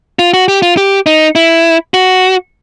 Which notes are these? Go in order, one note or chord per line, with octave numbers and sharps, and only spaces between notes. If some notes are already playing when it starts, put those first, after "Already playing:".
F4
F#4
G4
F4
G4
D#4
E4
F#4